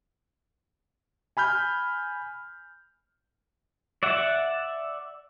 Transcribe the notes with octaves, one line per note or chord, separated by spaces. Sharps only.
G#5 B5 F6 G6
D5 E5 F#5